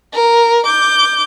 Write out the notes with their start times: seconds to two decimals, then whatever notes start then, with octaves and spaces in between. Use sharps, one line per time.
0.13 A#4
0.66 D6 G6